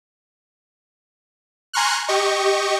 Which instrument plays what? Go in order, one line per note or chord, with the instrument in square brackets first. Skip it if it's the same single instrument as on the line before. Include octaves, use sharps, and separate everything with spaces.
[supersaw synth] G#5 A#5 C6 C#6 F6 F#6
G4 D#5 C#6